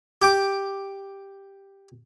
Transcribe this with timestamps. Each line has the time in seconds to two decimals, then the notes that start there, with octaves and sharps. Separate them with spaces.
0.22 G4 G5 D6